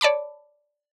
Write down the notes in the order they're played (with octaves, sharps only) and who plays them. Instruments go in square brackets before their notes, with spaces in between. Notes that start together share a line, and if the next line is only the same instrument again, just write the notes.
[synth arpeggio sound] C#5 D5 A5 B5 D6